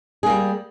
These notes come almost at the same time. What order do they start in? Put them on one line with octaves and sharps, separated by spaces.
G#4 A#3 G3